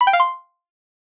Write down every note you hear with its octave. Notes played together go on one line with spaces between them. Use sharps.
B5
G5
F5
C6